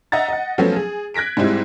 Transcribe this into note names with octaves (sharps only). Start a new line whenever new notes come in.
D#5 E5 F#5 A#5 A6
D#5 F#5
F3 F#3 A3 B3 C#4
G#4
F#6 G#6 A#6 B6 D7
G#2 G3 G#3 C4 E4